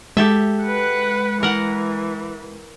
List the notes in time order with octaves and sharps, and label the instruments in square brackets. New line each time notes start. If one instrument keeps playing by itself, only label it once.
[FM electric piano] G#3 [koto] G4 A4 E5
[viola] B4 F#5
[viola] E3 [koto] A#4 F#5